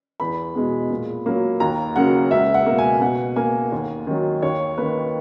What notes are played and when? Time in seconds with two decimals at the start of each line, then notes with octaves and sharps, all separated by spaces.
0.20 E2 B5
0.55 B2 G#3 B3
0.90 A#2
1.26 F#3 A#3
1.60 D#2 A#5
1.96 C#3 F#3 A#3 F#5
2.31 C#2 E5
2.54 F#5
2.66 B2 A#3
2.78 G#5
3.01 B2 F#5
3.36 A#3 G#5
3.72 D#2
4.07 D#3 F#3
4.42 D#2 C#5
4.78 D#3 A#3 B4